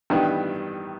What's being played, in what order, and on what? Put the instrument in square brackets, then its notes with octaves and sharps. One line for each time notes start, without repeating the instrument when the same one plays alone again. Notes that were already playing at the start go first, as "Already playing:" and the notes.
[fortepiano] A1 G2 D#3 G3 B3